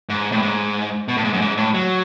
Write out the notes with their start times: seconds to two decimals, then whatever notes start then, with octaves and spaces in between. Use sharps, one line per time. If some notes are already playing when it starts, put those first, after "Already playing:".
0.09 G#2
0.32 A2
0.42 G#2
1.08 B2
1.17 A2
1.24 G#2
1.33 F#2
1.41 G#2
1.57 A2
1.74 F#3